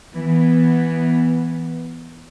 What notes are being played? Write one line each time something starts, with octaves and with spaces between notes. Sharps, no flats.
E3 B3